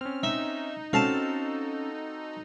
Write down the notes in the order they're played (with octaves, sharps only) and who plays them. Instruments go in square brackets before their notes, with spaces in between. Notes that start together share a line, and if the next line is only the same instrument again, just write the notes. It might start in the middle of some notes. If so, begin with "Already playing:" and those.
[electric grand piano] C4 C#4 [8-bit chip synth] F6
[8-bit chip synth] D#4 [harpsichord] E5
[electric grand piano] C4 F#4 A4 [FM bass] C#4 [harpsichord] F5 A5